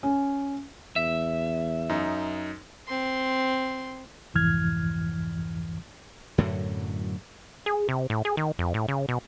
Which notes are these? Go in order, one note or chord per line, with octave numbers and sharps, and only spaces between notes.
C#4
E2 E5
F#2 D#4
C4 C6
C2 F2 G#2 E3 F6 G#6
F#2 A2 D3 F#3
G#4
C3
A2
G#4
D#3
F2
A2
C#3
B2